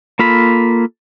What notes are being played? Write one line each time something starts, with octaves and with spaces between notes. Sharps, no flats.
A#3 F4 A4 B5